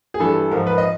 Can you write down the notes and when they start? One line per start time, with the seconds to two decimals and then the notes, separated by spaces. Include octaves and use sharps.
0.14 G#4
0.20 G2 E3 G3 A4
0.51 G#2 F3 A#4
0.67 B4
0.78 D#5